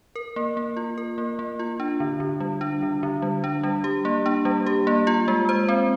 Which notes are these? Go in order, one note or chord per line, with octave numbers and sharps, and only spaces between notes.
A#4
A#3
A#3
F4
A#4
A#3
A#3
F4
D4
D3
D3
G3
D4
D3
D3
G3
D4
G3
G4
A#3
D4
G3
G4
A#3
F4
G#3
C5
C4